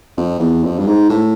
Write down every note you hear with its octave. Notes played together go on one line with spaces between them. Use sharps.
F2
E2
F2
G2
G#2
A2